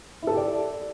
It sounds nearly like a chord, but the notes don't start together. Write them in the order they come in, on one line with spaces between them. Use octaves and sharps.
E4 A4 G4 D5